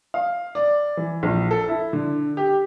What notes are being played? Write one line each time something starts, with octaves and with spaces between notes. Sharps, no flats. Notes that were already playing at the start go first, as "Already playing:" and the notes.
F5
D5
E3
A#1
A4
E4
D3
G4